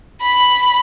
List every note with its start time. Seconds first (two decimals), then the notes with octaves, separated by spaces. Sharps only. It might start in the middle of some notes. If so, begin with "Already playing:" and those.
0.22 B5